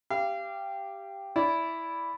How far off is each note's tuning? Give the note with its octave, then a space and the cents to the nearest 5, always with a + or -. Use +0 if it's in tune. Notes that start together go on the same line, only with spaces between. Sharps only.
G4 +0 F5 -30
E4 +0 D5 -20